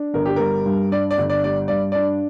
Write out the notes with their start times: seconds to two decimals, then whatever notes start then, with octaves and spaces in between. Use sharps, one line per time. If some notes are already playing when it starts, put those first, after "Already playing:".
Already playing: D4
0.14 G1 A#4
0.25 G4
0.36 G3 A#4
0.66 G2
0.92 D4 D5
1.11 D5
1.18 G1
1.30 D5
1.44 G3 D5
1.68 G2 D5
1.92 D4 D5